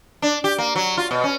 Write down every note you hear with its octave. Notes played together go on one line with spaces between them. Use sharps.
D4
G4
A#3
F#3
F4
B2
C#4